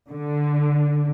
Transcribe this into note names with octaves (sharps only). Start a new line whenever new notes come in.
D3